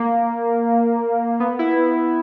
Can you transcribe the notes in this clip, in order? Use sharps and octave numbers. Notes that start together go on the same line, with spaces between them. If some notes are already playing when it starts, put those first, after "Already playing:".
Already playing: A#3
B3
E4